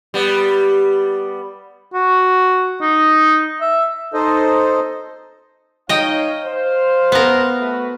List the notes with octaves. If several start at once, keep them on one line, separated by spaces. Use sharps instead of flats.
G3 B3
F#4
D#4
E5
D#4 A4 C5 D#5
D#4 C#5 D#5 F5 G5
C5 F5
B3 A#4
A3 F#4 B4